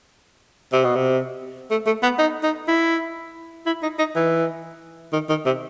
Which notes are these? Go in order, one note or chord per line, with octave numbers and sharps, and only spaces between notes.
C3
B2
C3
A3
A3
B3
D#4
D#4
E4
E4
D#4
D#4
E3
D#3
D#3
C3